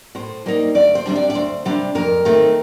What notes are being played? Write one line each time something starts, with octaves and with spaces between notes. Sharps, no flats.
A2 C5
G3 A#3 D#4
D2 D5
C5
C3 G3 D4
D5
D5
D2 C5
C3 G3 D4
F2 A#4
D#3 A3 C4